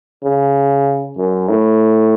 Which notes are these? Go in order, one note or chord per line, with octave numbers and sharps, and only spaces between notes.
C#3
F#2
A2